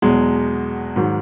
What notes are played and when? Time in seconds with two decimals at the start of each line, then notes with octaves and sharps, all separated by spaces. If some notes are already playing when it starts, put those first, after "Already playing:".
0.02 E2 B2 F#3 G#3
0.96 G#2 D#3 F#3